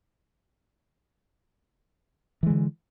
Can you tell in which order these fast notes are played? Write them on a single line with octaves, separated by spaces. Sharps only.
E3 G#3 D3